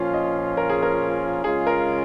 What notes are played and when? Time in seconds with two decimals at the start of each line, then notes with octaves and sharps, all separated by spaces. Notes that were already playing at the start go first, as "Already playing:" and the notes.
Already playing: A#2 F3 C#4 F4 F5
0.14 D#5
0.57 A#4
0.69 G#4
0.82 A#4
1.44 C#3 G#3 C#4 F4 G#4
1.67 A#4